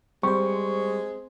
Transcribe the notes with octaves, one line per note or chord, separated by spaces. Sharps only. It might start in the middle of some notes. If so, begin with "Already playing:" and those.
G3 G#3 C4 C5 C#6